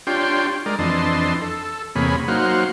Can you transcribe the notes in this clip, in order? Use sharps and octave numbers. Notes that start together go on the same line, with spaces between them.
D4 F4 G4 C#5 G5 C6
G#3 A#4 D5
F2 E3 D4 D#5 A5 C6
A4
E2 C3 A#3 G#4 C#5 B5
F#3 A#3 D#4 C5 F5 F#5